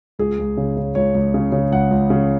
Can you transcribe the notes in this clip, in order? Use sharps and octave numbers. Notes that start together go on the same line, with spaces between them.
C#2 G#4
C#2
C#3
C#3
C#2 C#5
C#2
C#3
C#3
C#2 F#5
C#2
C#3